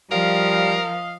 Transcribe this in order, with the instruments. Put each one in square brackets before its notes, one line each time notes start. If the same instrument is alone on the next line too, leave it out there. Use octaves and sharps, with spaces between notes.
[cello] F3 [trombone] G3 [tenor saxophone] A#4 [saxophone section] D#5 F5